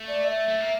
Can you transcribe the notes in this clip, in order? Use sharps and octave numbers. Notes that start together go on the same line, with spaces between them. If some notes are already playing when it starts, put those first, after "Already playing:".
Already playing: A3
D5
E5
A3
A#3